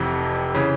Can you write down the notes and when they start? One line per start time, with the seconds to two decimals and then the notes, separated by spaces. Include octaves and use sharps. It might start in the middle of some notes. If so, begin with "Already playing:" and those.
Already playing: F1 F2 C3 E3
0.54 C#3 E3